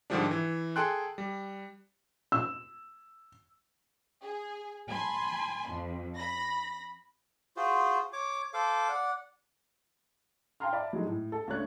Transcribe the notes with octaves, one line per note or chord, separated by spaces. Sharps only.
G#2 D3 D#3 F3 G3 D4
E3
G#4 A4 G5 C6 F#6
G3
E6
G#4
G#5 A5 B5 C6
F2
B5 A#6
F4 F#4 G#4 C5
C#5 D6
A4 C5 F5 D6
D5 F#5
F5 G5 A5 A#5 C6 F6
D5 E5 A5 B5
F#3 G#3 A3 D#4
A2
A4
C#2 A3 D4 C#5 F#6